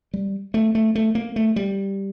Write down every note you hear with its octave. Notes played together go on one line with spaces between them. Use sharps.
G3
A3
A3
A3
A#3
A3
G3